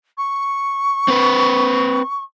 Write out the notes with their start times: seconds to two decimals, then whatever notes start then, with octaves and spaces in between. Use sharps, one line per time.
0.18 C#6
1.08 C4 B4